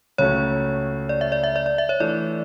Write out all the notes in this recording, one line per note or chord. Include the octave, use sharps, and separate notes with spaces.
C#2 C#3 F#3 A3 C#4 C#5
D5
E5
D5
E5
D5
D5
E5
C#5
E3 A3 D4 D5